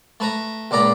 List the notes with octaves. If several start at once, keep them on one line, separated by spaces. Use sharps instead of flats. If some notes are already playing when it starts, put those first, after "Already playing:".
A3 B4 A#5
C#2 A#2 D5 A#5 B5